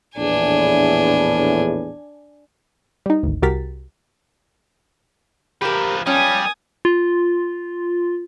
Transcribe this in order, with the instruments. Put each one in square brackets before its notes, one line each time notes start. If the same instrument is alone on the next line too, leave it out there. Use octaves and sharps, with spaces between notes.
[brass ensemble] A#1 E2 A2 [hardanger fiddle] D4 G#5
[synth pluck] G3 D#4
G#1 D2
C2 F#4 G4 A#4 A6 B6
[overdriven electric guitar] F3 B4 [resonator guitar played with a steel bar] G4 A#4
[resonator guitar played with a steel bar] F3 C#4 [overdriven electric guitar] G3 [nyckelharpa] G#5 D#6
[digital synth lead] F4